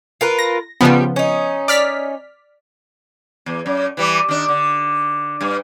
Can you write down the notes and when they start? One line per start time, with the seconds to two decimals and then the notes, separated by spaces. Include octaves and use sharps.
0.21 F4 A#4 B4
0.39 A#6
0.81 C#3 F3 G3 B3 G4
1.16 C#4 D#4
1.68 D5 F6 B6
3.46 E2
3.66 F#2
3.97 E3 G3
4.28 D#3 D4
4.48 D3
5.41 G2